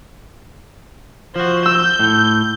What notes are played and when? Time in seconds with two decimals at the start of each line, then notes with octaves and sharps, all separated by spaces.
1.36 F3 F#4 C5
1.66 E6 G6
1.99 A2